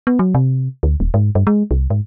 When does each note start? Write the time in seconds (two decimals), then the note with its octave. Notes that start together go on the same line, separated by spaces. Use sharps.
0.07 B3
0.19 F#3
0.35 C3
0.83 D2
1.00 D#1
1.14 G#2
1.35 G2
1.47 G#3
1.71 C2
1.90 G#2